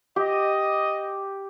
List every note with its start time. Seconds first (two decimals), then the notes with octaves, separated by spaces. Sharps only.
0.16 G4 D#5